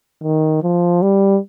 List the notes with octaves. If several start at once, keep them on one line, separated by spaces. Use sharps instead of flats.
D#3
F3
G3